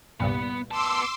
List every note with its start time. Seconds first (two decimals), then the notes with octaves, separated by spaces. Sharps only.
0.20 C2 G2 A#2 B3
0.71 B3 A5 C6 D6 E6